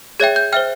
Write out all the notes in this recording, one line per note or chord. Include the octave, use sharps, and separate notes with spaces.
G#4 C#5 E5 G5 G#6
G6
C5 E5 G5 F6